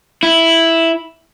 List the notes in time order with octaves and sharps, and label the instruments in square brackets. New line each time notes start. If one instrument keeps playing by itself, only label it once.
[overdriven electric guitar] E4